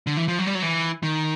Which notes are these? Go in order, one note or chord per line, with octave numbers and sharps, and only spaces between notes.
D3
E3
F3
F#3
G3
F#3
E3
D#3